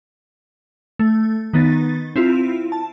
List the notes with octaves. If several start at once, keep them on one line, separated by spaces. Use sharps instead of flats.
A3
D#3 B3 D#4 A6
C4 E4 F4
A5